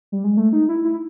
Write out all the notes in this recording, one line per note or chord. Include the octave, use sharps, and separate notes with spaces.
G3
G#3
A3
D#4
E4
E4